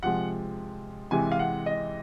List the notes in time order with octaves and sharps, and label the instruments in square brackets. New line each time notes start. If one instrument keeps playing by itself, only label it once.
[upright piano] C3 F3 G#3 F#5
C3 E3 G#3 G#5
F5
F#5
D#5